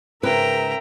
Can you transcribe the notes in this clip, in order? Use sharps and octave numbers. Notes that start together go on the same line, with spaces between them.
G#2 C#3 A#4 B4 E5 G5 A#5